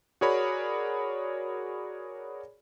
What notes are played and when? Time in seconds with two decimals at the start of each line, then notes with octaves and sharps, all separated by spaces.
0.21 F#4 G#4 A#4 C#5 D5 B5